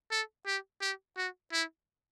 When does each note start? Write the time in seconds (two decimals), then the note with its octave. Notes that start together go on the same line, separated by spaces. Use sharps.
0.11 A4
0.46 G4
0.81 G4
1.17 F#4
1.53 E4